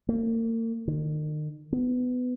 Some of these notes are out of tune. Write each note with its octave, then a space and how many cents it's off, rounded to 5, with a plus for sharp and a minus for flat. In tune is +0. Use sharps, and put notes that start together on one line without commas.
A#3 -40
D#3 -40
B3 +20